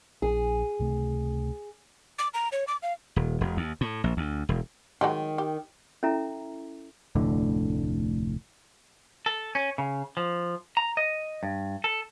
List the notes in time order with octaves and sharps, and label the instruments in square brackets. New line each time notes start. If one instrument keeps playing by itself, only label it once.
[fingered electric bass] A#1 D4 [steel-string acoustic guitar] G#4
[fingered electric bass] C#2 C3 A3
[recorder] D6
A#5
C#5
D6
F5
[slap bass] D#1
E1
D#2
A2
A#1
D2
E1
[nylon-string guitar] D#3 [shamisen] F#3 G#3 G4
[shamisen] G4
[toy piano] C#4 E4 A4 E5 A#5
[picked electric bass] F1 D2 A2 D3
[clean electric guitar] A4
C#4
C#3
F3
A#5
D#5
G2
A4